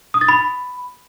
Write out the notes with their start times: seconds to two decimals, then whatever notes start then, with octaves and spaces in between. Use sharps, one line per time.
0.14 D#6
0.21 A6
0.29 B5